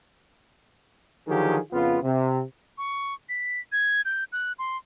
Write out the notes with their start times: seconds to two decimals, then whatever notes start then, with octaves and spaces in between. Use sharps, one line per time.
1.27 D3 D#3 F3 F#3 G4 G#4
1.72 F2 C#3 B3 F4
2.03 C3
2.78 C#6
3.29 B6
3.72 G#6
4.05 G6
4.32 F#6
4.59 C6